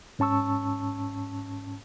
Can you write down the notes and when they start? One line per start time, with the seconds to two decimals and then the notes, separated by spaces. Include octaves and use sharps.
0.19 G#2 C#4 A5 C#6 E6